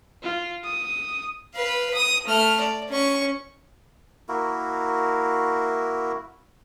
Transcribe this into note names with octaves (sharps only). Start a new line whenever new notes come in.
F4
D#6
B4 F5
D#6
A3 F6
D5
C#4 C#6
A#3 E4 F#4 A#4